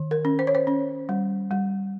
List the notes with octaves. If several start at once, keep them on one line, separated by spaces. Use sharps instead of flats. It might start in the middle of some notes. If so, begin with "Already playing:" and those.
Already playing: D#3
A#4
C#4
C5
C#5
C5
C#4
G3
G3